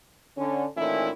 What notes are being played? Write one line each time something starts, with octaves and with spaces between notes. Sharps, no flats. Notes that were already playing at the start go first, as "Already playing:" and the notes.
D3 C#4
A#2 D#3 E3 A3 C#4 E4